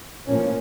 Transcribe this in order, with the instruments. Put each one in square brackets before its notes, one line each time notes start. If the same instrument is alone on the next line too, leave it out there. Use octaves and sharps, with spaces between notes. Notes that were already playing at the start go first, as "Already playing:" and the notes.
[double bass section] A2 F3 A#3 C#4